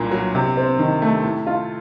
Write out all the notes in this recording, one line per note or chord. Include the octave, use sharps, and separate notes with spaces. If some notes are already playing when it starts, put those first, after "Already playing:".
Already playing: C2 A#2 A#3
F#3
C3
C4
D#3
A3
A2
F4